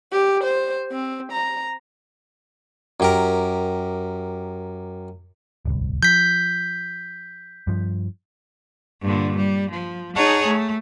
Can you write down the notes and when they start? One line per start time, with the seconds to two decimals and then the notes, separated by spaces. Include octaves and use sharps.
0.12 G4
0.44 C5
0.92 C4
1.32 A#5
3.00 F#2 G4 A#4
5.65 D1 G1 C2
6.03 F3 G6 B6
7.67 G2 F3
9.02 G2 A#2 D3
9.36 G3
9.70 F3
10.15 D#4 G#4 C#5 F#5 A5 A#5
10.47 A3